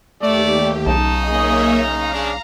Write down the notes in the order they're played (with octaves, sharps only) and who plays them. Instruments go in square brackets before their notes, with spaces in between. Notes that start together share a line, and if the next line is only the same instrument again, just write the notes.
[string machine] D#2 G4 [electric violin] A3 [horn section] D5
[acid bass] B1 [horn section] C#3 D#4 [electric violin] A5
[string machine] A#3 C#5 E5 [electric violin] G#4 D#5
[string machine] F5 [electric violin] A#5
[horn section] C#3 D4